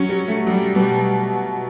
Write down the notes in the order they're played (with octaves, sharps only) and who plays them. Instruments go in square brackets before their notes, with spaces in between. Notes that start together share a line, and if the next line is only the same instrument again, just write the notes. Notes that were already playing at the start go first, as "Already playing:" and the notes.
Already playing: [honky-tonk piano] F#3 [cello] C#4
[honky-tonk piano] G3
A3
[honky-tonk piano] F#3 [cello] G3
[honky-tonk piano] B2 [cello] G3